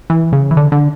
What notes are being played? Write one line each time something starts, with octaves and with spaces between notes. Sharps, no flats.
E3
C#3
E3
D3
D3